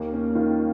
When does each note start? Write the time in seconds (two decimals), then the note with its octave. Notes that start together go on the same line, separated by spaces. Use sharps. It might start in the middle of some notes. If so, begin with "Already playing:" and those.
Already playing: D#2 A#3
0.13 C#4
0.35 D#3 F4